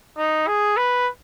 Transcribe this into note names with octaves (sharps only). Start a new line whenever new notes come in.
D#4
G#4
B4